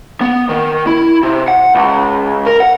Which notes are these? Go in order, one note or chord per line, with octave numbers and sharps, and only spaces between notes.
B3
D#3
E4
C3
F#5
C#2
A#4
F#5